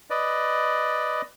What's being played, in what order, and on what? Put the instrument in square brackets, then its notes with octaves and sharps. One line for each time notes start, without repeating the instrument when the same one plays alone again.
[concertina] B4 D5 D#5